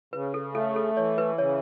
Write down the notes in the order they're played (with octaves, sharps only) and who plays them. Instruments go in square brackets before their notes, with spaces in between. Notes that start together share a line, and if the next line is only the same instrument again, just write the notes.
[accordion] C#3 [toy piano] B4
[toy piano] A4
[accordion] A3 [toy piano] A4
[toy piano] A4
[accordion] E3 [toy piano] C#5
[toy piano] B4
[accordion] C#3 [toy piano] C#5